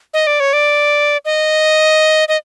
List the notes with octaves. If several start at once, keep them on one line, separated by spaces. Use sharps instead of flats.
D#5
D5
C#5
D5
D#5
D#5